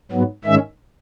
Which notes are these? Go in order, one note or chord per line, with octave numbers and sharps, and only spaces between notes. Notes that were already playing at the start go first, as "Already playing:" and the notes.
G#2 F#3 B3
G#2 D#3 G#3 C#4 E5